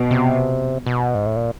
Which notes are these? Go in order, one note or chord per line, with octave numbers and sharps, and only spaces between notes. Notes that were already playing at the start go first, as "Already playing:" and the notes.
Already playing: B2
C3
B2
G#2
A2
A#2